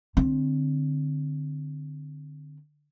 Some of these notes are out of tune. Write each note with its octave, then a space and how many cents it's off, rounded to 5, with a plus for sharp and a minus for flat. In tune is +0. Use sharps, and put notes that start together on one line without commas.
D3 +15 C4 +0